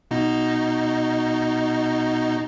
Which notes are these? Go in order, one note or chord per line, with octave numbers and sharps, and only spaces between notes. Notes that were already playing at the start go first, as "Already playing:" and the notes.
B2 D#4